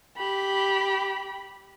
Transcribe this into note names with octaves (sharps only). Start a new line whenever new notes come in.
G4 B5